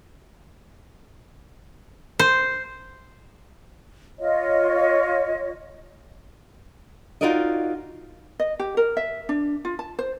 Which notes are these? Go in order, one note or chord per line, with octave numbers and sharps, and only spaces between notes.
C5
F4 C#5 D#5
D#4 F4 F#4 A#4 D5 D#5
D#5
G4
A#4
E5
D4
F4
A5
C5